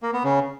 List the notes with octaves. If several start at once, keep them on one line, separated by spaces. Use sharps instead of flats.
A#3
B3
C#3